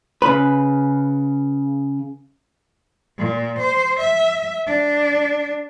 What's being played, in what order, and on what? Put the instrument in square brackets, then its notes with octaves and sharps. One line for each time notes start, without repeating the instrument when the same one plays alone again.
[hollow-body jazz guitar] C#3 B4
[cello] A#2
C5
E5
D4